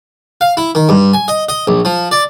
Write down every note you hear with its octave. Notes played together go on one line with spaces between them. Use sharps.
F5
E4
D#3
G2
G#5
D#5
D#5
A#1
F3
D5